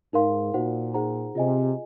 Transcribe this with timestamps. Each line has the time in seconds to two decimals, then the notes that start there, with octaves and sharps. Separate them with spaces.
0.13 G#2 D#4 A#4 F5 C6
0.54 A#2 D#4 F#4 C5 F#5
0.94 D#4 G#4 C5 F#5 A#5
1.35 C3 F4 G#4 D#5 G#5